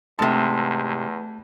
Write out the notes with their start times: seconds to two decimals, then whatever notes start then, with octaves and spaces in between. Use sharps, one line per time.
0.19 E2 G#2 C3 A3 A5